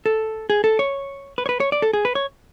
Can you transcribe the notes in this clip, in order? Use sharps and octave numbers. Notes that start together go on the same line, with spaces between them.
A4
G#4
A4
C#5
B4
C#5
B4
C#5
D5
A4
G#4
B4
C#5